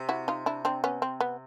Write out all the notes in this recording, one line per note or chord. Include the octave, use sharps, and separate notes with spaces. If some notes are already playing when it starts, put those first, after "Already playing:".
Already playing: C3
E4 F#4
D#4 F4
D4 E4
C4 D4
B3 C#4
C4
B3